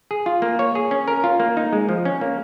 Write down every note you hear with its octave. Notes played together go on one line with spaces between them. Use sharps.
G#4
F4
A#3
C#5
G#4
C#4
A#4
F4
A#3
D#4
G#3
F3
C#4
A#3